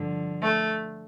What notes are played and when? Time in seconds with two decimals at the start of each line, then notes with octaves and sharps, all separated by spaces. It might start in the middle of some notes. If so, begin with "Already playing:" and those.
Already playing: G2 D3 F3
0.42 A3